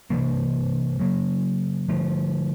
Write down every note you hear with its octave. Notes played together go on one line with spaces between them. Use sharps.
C3 E3 G3 A#3
C#3 F#3 A#3
D3 F3 A3